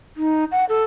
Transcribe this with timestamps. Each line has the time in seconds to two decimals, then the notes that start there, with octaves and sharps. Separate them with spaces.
0.17 D#4
0.52 F#5
0.69 A4